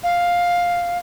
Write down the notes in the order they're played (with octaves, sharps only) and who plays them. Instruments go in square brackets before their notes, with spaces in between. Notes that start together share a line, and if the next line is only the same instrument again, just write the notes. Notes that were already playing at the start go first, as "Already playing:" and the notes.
[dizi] F5